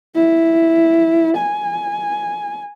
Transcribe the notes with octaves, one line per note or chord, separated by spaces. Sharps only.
E4
G#5